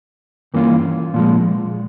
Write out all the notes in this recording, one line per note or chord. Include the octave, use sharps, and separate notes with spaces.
G2 E3 A#3 C#4 F4
A#2 F3 G#3